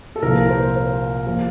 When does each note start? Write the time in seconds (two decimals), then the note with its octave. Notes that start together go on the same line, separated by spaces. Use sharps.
0.16 A4
0.22 C2 A#2 F3 A#4
0.49 C5
0.75 C5
1.27 A#2 F3